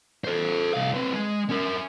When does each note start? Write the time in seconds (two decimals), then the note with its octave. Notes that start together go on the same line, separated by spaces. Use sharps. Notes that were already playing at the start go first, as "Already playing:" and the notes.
0.24 A4 C5
0.74 C2 F5
0.94 C4 B4
1.13 G#3
1.50 C#4 A#4